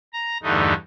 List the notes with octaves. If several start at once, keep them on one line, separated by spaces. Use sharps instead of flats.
A#5
E2 G2 D3 A3 D#4